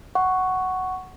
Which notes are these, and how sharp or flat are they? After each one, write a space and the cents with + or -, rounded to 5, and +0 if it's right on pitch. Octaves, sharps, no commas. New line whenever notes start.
F#5 +5 C#6 +0